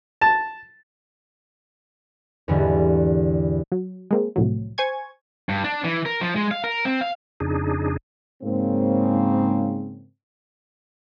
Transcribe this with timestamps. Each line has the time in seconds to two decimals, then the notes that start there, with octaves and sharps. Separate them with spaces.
0.21 A5
2.48 E2 G#2 D3 G3
3.72 F#3
4.11 G#3 A#3 C4
4.36 C2 A2 F3 F#3
4.78 C5 G#5 C#6 G#6
5.49 G2
5.64 D4
5.84 E3
6.06 A#4
6.21 F3
6.36 G#3
6.51 F5
6.64 A#4
6.85 C4
7.01 F5
7.40 F2 C#3 D4 D#4 G#4
8.43 G#2 C#3 A#3 C4